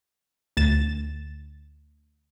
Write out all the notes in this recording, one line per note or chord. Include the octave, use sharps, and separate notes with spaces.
D2 A6 E7